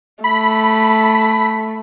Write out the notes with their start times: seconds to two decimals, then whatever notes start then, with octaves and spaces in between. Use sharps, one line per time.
0.24 A3 B5 B6